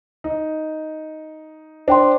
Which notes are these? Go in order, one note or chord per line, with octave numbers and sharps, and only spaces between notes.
D#4
D4 C5 G5 C6